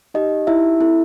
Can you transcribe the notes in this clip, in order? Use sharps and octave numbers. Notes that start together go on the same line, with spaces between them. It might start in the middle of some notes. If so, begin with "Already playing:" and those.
D#4 G4 D#5
E4 E5
C4 E4 A4 E5